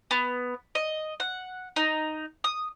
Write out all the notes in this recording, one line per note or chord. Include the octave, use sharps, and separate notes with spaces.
B3
D#5
F#5
D#4
D#6